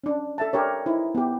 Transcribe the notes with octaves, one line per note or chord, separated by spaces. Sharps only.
C#4 D4
A4 E5 A5
D4 G4 A#4 C#5
D#4 E4 C5
B3 G4